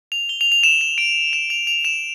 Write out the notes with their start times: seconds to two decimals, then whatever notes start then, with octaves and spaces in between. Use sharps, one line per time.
0.12 F7
0.29 G7
0.41 F7
0.52 F7
0.63 E7
0.81 E7
0.98 D7
1.33 E7
1.50 F7
1.67 F7
1.85 E7